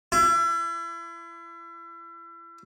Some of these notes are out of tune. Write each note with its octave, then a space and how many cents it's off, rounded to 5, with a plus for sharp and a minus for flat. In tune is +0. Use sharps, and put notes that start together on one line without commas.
E4 +35